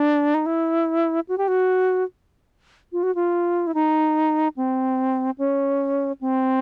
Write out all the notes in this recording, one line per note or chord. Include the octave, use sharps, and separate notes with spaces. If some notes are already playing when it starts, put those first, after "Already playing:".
Already playing: D4
D#4
E4
F#4
G4
F#4
F4
F#4
F4
E4
D#4
C4
C#4
C4